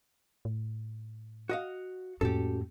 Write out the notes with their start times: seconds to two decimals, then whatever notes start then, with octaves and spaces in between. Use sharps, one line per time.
0.45 A2
1.49 F#4 D#5 F5
2.21 F2 A2 A#3 C#4 F#4 G4 A4